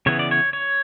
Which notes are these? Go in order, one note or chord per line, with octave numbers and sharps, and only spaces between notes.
C#3 E3 B3 C#5
D5
C#5
C#5